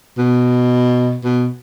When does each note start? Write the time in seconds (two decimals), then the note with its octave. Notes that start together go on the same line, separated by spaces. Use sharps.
0.18 B2
1.24 B2